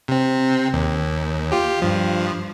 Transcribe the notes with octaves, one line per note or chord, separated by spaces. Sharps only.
C3 C4
D#2
F4 G4
G2 F3